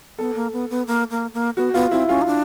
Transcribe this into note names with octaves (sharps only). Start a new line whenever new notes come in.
B3 A4
A#3
B3
B3
A#3
A#3
A#3
B3 F#4
B3 F4
C4 E4
C#4 F4
D#4
D4